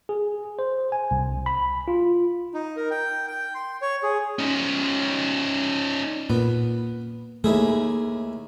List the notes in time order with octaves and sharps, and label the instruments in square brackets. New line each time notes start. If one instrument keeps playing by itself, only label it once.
[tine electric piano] G#4
C5
G#5
C2
B5
F4
[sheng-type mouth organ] D#4
A#4
G5
G5
C6
C#5
G#4
[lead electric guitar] C#4 D#4
[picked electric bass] A#2 [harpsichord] B3
[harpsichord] D#2 E4 G#4 [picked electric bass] A3